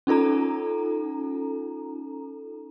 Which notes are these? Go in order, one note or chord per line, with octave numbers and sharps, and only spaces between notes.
C#4 D#4 F4 A4 A#5